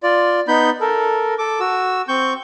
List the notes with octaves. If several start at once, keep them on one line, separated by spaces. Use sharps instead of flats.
F4 D5
B3 D#4 B5 G6
A4 A#4
A4 D6
F#4 E6
C4 C#6 G6